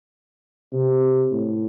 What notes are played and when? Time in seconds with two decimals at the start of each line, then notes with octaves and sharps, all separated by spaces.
0.73 C3
1.32 A2